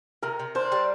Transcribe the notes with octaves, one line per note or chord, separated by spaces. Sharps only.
C3 A#4
C3
D4 C5
G3